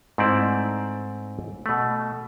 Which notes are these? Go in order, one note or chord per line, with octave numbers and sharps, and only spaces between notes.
G#2 A3 C4 E4 D5 A5
B2 A3